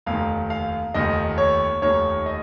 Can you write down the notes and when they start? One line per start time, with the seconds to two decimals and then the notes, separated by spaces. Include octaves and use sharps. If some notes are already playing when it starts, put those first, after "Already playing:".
0.06 F1 D#2 D#3 F5
0.50 F5
0.94 F1 D#2 D#3 D#5
1.38 C#5
1.82 F1 D#2 D#3 C#5
2.26 D#5